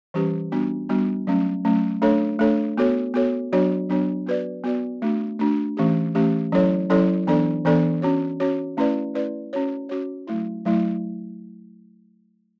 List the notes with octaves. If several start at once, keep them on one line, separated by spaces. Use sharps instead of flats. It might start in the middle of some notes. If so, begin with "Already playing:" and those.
E3 G3 C#4 G4 B4
G3 B3 D4 F#4
G3 B3 D4 F#4
F#3 A3 C#4
F#3 A3 C#4
A3 D4 A4 C#5
A3 D4 A4 C#5
B3 F#4 A4 C#5
B3 F#4 A4 C#5
F#3 B3 D4 F#4 C#5
F#3 B3 D4 F#4 C#5
B3 F#4 B4 D5
B3 F#4 B4 D5
A3 D4 F#4
A3 D4 F#4
E3 A3 C#4 G4
E3 A3 C#4 G4
F#3 C#4 E4 A4 C#5
F#3 C#4 E4 A4 C#5
E3 B3 D4 A4 D5
E3 B3 D4 A4 D5
C#4 F#4 C#5
C#4 F#4 C#5
A3 C#4 E4 B4 D5
A3 C#4 E4 B4 D5
C#4 F#4 C#5
C#4 F#4 C#5
F#3 A3 E4
F#3 A3 E4